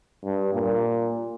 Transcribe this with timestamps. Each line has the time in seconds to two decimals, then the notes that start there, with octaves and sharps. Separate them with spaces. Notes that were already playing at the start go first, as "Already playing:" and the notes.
0.25 G2
0.55 A#2